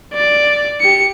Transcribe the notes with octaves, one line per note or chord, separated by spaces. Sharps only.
D5
G4 C#7